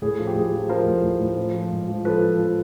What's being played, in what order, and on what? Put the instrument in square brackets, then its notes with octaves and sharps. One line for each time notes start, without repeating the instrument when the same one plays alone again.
[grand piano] A2 G#4
F3
G4
A2 G#4
F3
F3 A#4 C5
A2
A2
A2
F3
F3
G#2
F3
F3 A4 B4
F3
F3